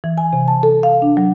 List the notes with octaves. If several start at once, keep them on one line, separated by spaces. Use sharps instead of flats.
E3
G#5
C3
A5
A4
F5
D4
F#3